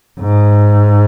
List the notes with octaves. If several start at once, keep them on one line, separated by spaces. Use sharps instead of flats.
G#2